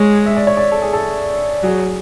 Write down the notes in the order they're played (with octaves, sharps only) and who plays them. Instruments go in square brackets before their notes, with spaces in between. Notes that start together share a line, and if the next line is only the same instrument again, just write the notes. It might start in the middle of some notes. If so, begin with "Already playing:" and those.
Already playing: [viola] G#3 [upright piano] C#5
[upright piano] E5
D5
C#5
D5
A4
G#4
A4
[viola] F#3 [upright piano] G#4